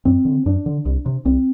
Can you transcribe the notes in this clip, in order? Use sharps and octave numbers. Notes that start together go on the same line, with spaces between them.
F#2 C4
D3
F#2 D4
D3
C2
C3
C2 C4